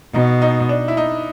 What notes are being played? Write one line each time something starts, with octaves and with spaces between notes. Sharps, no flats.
B2 D#4
D#4
D4
E4
D#4